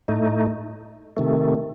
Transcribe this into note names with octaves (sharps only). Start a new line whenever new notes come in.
A2 A3 D#4
C3 D#3 A3